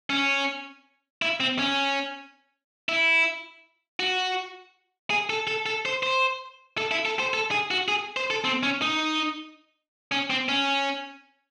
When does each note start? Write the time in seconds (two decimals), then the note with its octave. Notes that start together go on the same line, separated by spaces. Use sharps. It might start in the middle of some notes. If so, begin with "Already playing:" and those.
0.10 C#4
1.22 E4
1.40 C4
1.59 C#4
2.89 E4
4.00 F#4
5.10 G#4
5.30 A4
5.47 A4
5.66 A4
5.85 C5
6.03 C5
6.78 A4
6.91 E4
7.05 A4
7.20 C5
7.34 A4
7.51 G#4
7.71 F#4
7.88 G#4
8.17 C5
8.30 A4
8.44 C4
8.63 C#4
8.82 D#4
10.12 C#4
10.30 C4
10.49 C#4